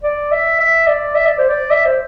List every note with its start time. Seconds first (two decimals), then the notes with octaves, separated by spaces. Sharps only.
0.03 D5
0.32 E5
0.60 E5
0.87 D5
1.15 E5
1.26 D5
1.38 C5
1.49 D5
1.71 E5
1.85 C5